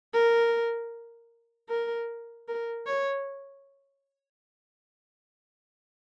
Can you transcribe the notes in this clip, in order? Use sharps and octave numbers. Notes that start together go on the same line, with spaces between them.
A#4
A#4
A#4
C#5